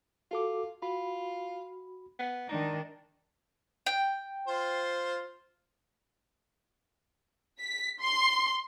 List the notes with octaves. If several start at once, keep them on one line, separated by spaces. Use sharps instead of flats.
F4 F#4 A4 D6
F4 F#4 B5
B3
D#3 D4 D#4
G5
F4 C5
B6
C6